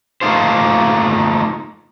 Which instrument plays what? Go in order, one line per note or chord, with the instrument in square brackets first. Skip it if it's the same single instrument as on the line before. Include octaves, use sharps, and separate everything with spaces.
[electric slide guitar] A3 A#3 D#4 F4 C5